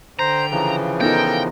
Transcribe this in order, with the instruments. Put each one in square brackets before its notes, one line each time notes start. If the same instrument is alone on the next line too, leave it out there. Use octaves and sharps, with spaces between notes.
[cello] D3 G5 [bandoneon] C5 [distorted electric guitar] A#5
[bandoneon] C#3 E3 F3
[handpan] B3 D#4 F4 [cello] A4 A#4 [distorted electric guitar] G5